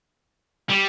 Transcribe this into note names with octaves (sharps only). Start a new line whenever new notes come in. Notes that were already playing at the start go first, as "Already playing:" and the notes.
G3